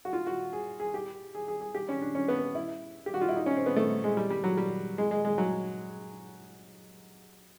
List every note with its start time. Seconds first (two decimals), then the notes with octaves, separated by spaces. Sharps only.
0.05 F#4
0.13 F4
0.27 F#4
0.53 G#4
0.80 G#4
0.94 G4
1.35 G#4
1.48 G#4
1.61 G#4
1.75 G4
1.89 C#4
2.02 D4
2.15 C#4
2.28 B3
2.55 E4
3.06 G4
3.14 F#4
3.21 F4
3.29 E4
3.36 D#4
3.46 C#4
3.57 C4
3.66 B3
3.76 A3
4.04 G#3
4.17 G3
4.30 G3
4.44 F#3
4.57 G3
4.98 G#3
5.11 G#3
5.25 G#3
5.38 F#3